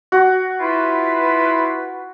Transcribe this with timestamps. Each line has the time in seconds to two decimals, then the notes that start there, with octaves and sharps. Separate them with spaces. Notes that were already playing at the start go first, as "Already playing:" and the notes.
0.12 F#4
0.60 E4 F4 B4